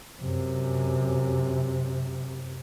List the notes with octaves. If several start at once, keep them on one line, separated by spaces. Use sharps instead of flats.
F#2 C3